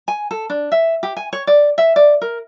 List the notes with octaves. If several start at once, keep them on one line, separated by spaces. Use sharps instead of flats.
G#5
A4
D4
E5
G4
G#5
C#5
D5
E5
D5
A#4